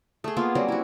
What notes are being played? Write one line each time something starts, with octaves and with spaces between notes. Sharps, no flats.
A3 G#4
A#3 B3 F4
F#3 G3 C4 C#4
E4 F#4